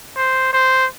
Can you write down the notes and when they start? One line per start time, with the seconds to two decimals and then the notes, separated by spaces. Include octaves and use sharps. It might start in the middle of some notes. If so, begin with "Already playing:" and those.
0.16 C5
0.53 C5